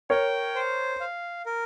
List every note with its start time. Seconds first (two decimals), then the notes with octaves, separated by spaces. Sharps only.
0.10 A#4 C#5 G5
0.55 C5
1.01 F5
1.46 A#4